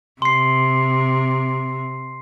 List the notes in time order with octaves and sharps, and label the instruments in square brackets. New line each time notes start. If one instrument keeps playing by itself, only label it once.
[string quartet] C3 [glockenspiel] C6 C7